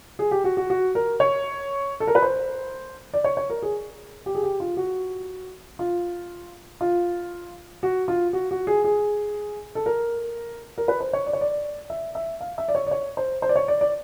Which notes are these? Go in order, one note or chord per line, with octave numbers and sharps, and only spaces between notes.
G#4
G4
F#4
F#4
F#4
A#4
C#5
A4
A#4
B4
C5
D5
C#5
C#5
A#4
G#4
G4
G#4
G4
F4
F#4
F4
F4
F#4
F4
F#4
F#4
G#4
G#4
A4
A#4
A#4
B4
C5
C#5
D5
C#5
D5
E5
E5
F5
E5
D5
C#5
D5
C#5
C5
C5
D5
C#5
D5
D5